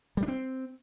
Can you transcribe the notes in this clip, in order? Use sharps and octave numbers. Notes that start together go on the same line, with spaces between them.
G3
D4
C4